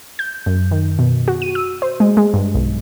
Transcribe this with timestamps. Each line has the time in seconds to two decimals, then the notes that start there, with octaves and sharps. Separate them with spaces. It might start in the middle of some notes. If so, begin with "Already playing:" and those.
0.19 G6
0.46 F#2
0.71 D#3
0.99 B2
1.28 F#4
1.42 D#7
1.55 E6
1.82 C5
2.00 G#3
2.17 G#3
2.34 G2
2.55 B1